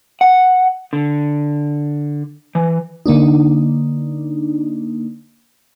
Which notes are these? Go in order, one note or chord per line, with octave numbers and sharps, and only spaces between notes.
F#5
D3
E3
D3 A#3 D4 D#4